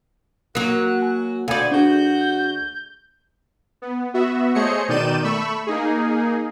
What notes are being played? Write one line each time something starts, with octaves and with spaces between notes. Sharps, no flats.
F#3 A#3 F#4 F#6
G#5
D2 D3 D5 F5 G#5 B5 G6
D4 F#4 G#4 G6
B3
B3 F#4 E5
A3 G#4 C5 C#5 D#5 C#7
B2 D#3 D5 G6 D#7 E7
A3 B5 C#6 E6
A#3 D#4 G#4